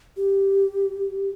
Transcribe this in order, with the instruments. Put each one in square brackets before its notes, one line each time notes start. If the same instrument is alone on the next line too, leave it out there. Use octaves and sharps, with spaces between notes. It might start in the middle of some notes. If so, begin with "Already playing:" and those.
[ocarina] G4